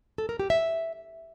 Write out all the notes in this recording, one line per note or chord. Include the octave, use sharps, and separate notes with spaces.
A4
A#4
G4
E5